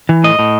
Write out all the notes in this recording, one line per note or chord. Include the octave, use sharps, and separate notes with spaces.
E3
A2 D#5
A2